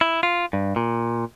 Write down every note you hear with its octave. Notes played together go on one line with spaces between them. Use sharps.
E4
F4
G2
A#2